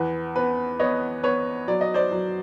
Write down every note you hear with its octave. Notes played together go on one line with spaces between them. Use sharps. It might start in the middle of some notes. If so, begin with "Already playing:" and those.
Already playing: E2 B4
B3 B4
B3 C#5 D#5
B3 B4 C#5
F#3 D5
D#5
C5 D5
F#3